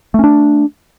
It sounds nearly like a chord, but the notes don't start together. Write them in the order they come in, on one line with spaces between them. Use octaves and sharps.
A3 C#4 D4